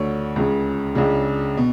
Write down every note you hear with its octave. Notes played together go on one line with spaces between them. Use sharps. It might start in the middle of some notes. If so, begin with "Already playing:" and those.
Already playing: D2 D3 C#5
C#2 C#3
C#2 C#3 D4
B2